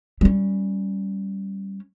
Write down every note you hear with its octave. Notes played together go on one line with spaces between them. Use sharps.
G3 C#4